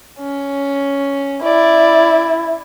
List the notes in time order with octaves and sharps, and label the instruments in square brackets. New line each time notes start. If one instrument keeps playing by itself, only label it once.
[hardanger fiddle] C#4
[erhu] E4 [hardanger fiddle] D5